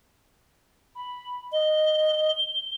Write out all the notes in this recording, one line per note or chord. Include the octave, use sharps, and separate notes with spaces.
B5
D#5 G7